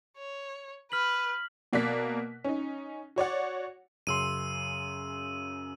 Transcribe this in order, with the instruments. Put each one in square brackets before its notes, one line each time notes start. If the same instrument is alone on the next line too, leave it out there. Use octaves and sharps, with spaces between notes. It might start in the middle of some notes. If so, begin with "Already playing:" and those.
[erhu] C#5
[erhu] B4 [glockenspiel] F6 B6 F#7
[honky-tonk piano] B2 A#3 D5 F#6 B6
C#4 D#4
F#4 C#5 D5 F#5
[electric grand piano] F#2 C#3 C6 [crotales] E6 D#7